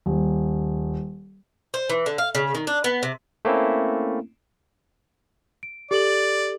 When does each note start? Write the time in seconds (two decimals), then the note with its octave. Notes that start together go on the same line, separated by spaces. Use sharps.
0.06 D#1
1.74 C5
1.90 E3
2.06 D3
2.18 F5
2.35 C#3
2.55 D#3
2.67 D4
2.84 B3
3.03 C3
3.45 A3 A#3 C4 C#4 E4
5.63 D7
5.91 G4 A4 D5 F#7